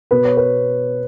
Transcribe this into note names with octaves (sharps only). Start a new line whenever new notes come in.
B2 B4
C#5
B4